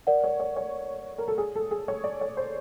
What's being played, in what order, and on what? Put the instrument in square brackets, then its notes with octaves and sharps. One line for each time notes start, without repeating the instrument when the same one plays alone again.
[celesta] A#4 D5 F#5
[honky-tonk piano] C#5
C#5
C#5
A#4
A4
G#4
A4
G#4
C#5
D5
C#5
C5